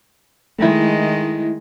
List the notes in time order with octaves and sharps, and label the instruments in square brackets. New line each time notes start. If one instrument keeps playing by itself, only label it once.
[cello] D#3 G#3 [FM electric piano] A3 E4